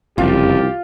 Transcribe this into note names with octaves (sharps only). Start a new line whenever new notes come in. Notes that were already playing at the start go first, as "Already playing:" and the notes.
F#1 C2 F2 F4 G4